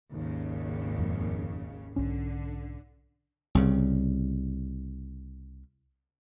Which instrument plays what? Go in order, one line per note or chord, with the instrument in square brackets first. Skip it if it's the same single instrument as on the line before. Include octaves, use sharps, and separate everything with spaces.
[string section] G#1 D#2 C#3
[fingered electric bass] F2 F3
[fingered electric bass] B1 G#2 C#4 [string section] D3
[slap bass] C2 C#3